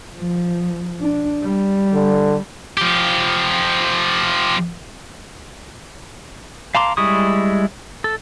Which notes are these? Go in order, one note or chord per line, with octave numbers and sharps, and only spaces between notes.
F3
D4
G3
D3
F3 G4
F5 A5 A#5 C6 D6
G3 G#3 E4 C#6 D#6
A4